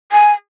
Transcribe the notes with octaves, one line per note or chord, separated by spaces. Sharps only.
G#5